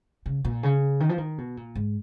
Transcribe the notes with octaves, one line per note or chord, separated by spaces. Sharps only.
C#3
A#2
C#3
D#3
F3
D#3
B2
A#2
G#2